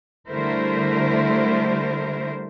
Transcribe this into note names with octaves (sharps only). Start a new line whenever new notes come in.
D3 G3 A3 E4 A#4 C5